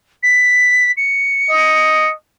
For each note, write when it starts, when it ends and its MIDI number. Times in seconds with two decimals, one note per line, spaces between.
0.23 0.91 95
0.97 2.09 97
1.49 2.13 75